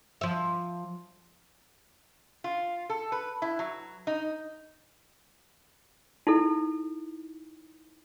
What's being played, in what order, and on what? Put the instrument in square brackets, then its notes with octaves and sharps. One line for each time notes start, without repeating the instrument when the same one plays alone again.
[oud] F3 E5
[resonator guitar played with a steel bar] F4
A4
B4
E4
F#3
D#4
[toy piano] D#4 E4 A4